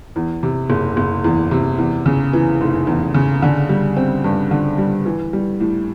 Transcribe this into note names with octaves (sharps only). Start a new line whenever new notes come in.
E2
C3
F#1
F#1
E2
C3
E2
C#3
E3
F1
E2
C#3
D3
G3
C4
G2
D3
G3
E3
G3
A2